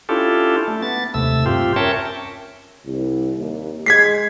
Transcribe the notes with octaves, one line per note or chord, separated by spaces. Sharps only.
C#4 D4 E4 F4 G4 A4
A3
B3 A6
D#2 C3 A3 E6
G2 C4 F4 G4
C#4 A#4 C#5 E5 G5 A5
C2
D#2
G#3 G#6 B6 C7